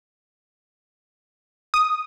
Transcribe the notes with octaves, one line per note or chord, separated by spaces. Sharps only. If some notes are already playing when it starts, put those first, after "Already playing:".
D#6